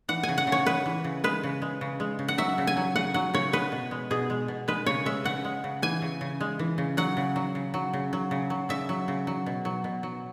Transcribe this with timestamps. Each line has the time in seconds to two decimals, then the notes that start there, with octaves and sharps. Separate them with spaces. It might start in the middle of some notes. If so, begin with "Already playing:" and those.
0.08 E3 F#5
0.23 G#5
0.29 C#3
0.38 F#5
0.47 C#3
0.52 C#5
0.66 G#3 B4
0.86 E3
1.04 C#3
1.24 G#3 B4
1.43 C#3
1.62 G#3
1.81 C#3
2.00 G#3
2.19 C#3
2.28 F#5
2.38 F#3 E5
2.58 C#3
2.67 G#5
2.77 F#3
2.96 C#3 F#5
3.14 F#3 F#5
3.34 C#3 C#5
3.53 G#3 B4
3.72 B2
3.91 G#3
4.11 B2 G#4
4.30 G#3
4.48 B2
4.68 G#3 B4
4.86 C#3 C#5
5.05 G#3 E5
5.24 C#3 F#5
5.45 G#3
5.64 C#3
5.82 E3 G#5
6.02 C#3
6.21 C#3
6.41 G#3
6.59 E3
6.78 C#3
6.97 F#3 F#5
7.17 C#3
7.36 F#3
7.55 C#3
7.74 F#3
7.93 C#3
8.13 F#3
8.31 C#3
8.50 F#3
8.69 C#3 E5
8.89 F#3
9.08 C#3
9.27 F#3
9.46 B2
9.65 F#3
9.84 B2
10.03 F#3